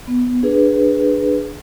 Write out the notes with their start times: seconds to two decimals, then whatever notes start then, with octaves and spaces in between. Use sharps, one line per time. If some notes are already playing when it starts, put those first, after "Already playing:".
0.07 B3
0.43 D4 G#4 B4